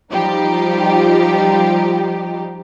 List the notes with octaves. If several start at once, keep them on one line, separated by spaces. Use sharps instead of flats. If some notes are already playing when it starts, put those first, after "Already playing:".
F3 G3 D#4 G4